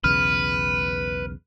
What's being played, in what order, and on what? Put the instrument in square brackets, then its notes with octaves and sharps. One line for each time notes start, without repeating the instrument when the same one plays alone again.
[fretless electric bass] B1 E2 C#3 [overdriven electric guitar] B4 [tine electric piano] F6